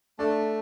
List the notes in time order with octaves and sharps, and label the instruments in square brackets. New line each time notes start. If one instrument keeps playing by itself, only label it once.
[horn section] A3 [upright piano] D4